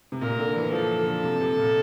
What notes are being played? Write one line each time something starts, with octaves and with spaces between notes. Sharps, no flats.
C3
A#2 A#4
D3
E3
F3 A4
D3
C3
C3
A#2